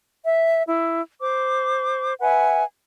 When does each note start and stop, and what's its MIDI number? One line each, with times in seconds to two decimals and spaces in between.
0.24 0.63 76
0.66 1.00 64
1.21 2.14 72
1.21 2.14 86
2.21 2.64 71
2.21 2.64 76
2.21 2.64 78
2.21 2.64 80